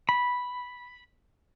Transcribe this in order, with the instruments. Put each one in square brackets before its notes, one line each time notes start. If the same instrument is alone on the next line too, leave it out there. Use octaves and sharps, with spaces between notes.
[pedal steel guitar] B5